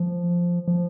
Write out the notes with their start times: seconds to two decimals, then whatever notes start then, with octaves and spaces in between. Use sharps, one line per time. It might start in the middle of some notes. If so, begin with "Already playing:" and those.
Already playing: F3
0.68 F3